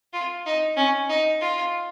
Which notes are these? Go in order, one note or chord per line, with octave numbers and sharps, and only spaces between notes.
F4
D#4
C#4
D#4
F4